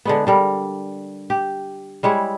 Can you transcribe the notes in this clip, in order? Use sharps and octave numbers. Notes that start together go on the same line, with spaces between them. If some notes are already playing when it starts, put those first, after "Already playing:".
D3 G#3 B3
D3 G3 A#4
G4
G3 G#3 E4 C#5